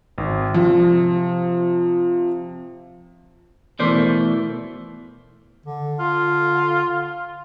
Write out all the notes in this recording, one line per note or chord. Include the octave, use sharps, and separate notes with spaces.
G#1
C3 F3
B2 E3 A3 A#4 C5 D5
D3
F4